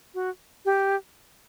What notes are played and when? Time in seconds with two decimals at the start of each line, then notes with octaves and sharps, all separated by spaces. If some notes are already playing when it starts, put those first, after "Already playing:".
0.15 F#4
0.65 G4